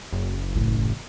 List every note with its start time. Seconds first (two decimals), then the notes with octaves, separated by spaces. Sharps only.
0.12 F#1
0.55 A1 C#3